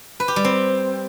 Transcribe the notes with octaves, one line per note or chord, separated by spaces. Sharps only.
B4
G4
G3
C4